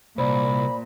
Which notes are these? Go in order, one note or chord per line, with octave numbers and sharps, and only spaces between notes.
C2 A#2 C5 D5 B5